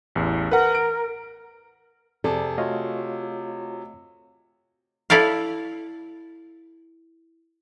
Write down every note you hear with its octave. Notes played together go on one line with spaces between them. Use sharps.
A1 E2
A#4 B4 F#5
D7
F2 C3 G#4 A4 D5 A5
A3 F4 F#4 C#5 D#5 F5
E4 A4 D5 F5